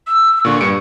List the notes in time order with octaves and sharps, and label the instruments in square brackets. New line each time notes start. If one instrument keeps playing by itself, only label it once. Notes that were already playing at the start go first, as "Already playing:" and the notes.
[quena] E6
[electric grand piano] A#2 D3 [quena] C#6
[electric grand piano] G2 C#7 D7